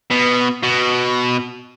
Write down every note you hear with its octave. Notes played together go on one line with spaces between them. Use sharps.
B2
B2